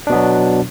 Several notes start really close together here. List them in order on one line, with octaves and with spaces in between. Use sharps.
D4 B2 B3 F#3